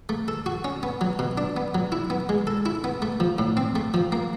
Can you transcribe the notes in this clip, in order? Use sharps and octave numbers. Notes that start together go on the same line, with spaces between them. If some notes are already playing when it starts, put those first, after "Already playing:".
A3
A4
F#4
C#4
B3
F#3
B2
D4
B3
F#3
E4
B3
G#3
A4
E4
B3
A3
F3
A2
C4
A3
F3
A#3